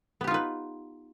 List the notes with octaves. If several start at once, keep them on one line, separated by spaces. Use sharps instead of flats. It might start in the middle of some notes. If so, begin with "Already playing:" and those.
B3 D#4 F4 G4 B4